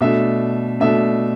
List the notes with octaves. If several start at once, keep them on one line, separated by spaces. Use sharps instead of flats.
B2 A3 D4 E5
B2 A3 D4 E5